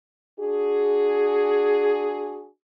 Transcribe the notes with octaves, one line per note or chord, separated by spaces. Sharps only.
D4 F#4 G#4